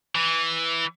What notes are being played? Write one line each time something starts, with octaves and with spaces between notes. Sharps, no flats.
E3